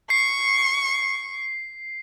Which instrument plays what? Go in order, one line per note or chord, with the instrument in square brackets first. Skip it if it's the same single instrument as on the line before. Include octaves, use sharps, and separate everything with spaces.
[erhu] C#6 [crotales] C7